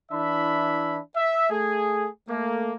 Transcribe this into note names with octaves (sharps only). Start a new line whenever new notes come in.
E3 D4 E4 E5 B5
E5
A3 G#4
A3 A#3